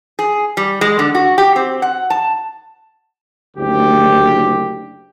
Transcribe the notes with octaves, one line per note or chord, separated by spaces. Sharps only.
G#4
G3
G#3
D3
F#4
G4
C4
F#5
A5
F#1 D2 G4